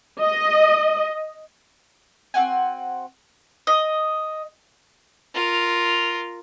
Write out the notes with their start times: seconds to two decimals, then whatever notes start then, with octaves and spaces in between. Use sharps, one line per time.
0.19 D#5
2.34 C4 F#4 F#5 G#5
3.67 D#5
5.34 F4 A#4